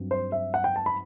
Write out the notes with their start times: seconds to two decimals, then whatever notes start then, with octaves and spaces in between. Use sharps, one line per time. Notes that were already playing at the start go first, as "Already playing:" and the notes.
Already playing: G2 F#3 C4
0.11 C5
0.32 E5
0.54 F#5
0.64 G5
0.76 A5
0.86 B5